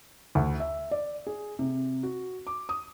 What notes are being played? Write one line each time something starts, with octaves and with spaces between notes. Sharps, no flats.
D2
E5
D5
G#4
C3
F#4
D6
D#6